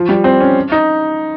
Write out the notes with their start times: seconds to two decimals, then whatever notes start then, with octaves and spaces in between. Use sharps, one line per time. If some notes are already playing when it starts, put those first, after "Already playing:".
Already playing: F3
0.09 G3
0.24 C4
0.41 C#4
0.72 D#4